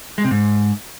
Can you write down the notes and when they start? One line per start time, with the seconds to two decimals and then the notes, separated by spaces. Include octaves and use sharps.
0.18 G#3
0.24 C3
0.31 G#2